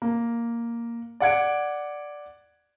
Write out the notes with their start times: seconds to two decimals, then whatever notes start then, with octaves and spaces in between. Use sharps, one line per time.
0.02 A#3
1.20 D5 F#5 G#6 D7